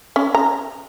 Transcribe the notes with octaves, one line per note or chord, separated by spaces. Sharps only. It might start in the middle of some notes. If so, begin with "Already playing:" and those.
C#4
A#5